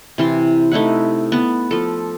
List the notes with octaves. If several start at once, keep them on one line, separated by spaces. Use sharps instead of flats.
C3 E3 A5 C6
A3 D#4 E4 F#5
B3 A5
F3 A4